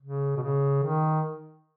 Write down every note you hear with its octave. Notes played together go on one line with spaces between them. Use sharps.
C#3
B2
C#3
D#3